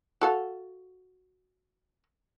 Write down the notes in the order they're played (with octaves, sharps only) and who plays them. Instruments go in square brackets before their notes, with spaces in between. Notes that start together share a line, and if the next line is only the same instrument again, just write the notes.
[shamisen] F#4 A4 F5